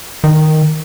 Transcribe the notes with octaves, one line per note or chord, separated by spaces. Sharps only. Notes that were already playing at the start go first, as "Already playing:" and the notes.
D#3